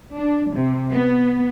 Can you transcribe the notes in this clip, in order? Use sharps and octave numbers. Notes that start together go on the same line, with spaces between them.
D4
C3
B3